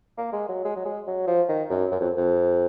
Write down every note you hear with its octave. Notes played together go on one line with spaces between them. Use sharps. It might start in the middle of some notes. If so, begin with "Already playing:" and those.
A#3
G#3
F#3
G#3
F#3
G#3
F#3
F3
D#3
F#2
F#2
F2
F2